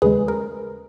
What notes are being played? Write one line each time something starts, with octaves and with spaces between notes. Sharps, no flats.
D#2 C#3 G#3 G#4 B4
A#4